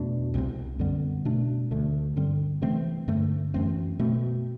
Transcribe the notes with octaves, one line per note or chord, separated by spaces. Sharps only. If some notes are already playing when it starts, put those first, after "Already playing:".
Already playing: E2 B2 A3 D4
C2 C3 G3 C4
F#2 D3 G3 B3
B2 A3 D4
D2 D3 A3 D4
G2 D3 G3 C4
C3 E3 A3 C4
G2 D3 A3
F#2 E3 A3 C4
B2 A3 C4